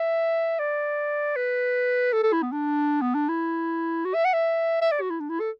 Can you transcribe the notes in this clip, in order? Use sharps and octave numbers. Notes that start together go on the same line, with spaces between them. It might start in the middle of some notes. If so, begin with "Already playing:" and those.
Already playing: E5
D5
B4
A4
A4
E4
B3
D4
B3
D4
E4
F#4
E5
F#5
E5
E5
D5
F#4
E4
D4
E4
A4